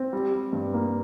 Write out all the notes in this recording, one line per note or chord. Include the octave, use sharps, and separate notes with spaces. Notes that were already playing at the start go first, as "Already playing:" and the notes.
Already playing: C4
G3
G3
G2
A#3